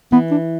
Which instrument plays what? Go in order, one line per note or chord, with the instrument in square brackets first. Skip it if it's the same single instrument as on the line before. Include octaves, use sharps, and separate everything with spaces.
[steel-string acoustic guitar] E3 [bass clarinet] B3
[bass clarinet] D4